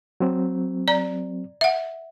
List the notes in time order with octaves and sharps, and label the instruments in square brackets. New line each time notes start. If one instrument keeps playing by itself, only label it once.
[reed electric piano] F#3 C4
[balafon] D5 A#5
E5 F#5